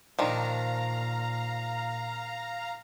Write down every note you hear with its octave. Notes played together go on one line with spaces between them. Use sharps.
A#2 D#3 F3 D4 F5 A#5